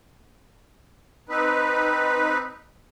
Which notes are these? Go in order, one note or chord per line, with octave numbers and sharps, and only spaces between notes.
C4 D#4 B4